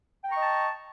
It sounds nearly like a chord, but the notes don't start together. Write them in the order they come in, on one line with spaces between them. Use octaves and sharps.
G5 A#5 C#6 D#5 A5